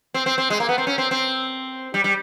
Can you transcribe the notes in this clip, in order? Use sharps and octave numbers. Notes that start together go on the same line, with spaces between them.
C4
C4
C4
G#3
A#3
B3
C4
C#4
C4
C4
G3
G3